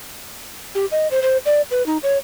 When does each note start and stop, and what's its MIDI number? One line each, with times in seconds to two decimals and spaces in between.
0.75 0.86 67
0.91 1.08 75
1.11 1.22 72
1.22 1.37 72
1.45 1.61 74
1.71 1.85 71
1.86 1.97 63
2.03 2.18 73